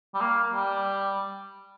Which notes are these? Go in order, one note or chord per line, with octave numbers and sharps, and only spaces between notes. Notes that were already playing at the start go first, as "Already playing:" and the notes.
G3
A#3
G3